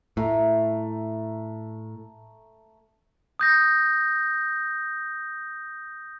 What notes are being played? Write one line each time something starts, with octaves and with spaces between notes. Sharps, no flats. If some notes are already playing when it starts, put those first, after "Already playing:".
A2 A3 A#5
D#6 G6 A#6